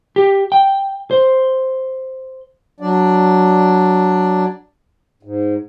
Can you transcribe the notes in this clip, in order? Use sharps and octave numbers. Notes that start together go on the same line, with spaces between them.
G4
G5
C5
F#3 D4 D5
G#2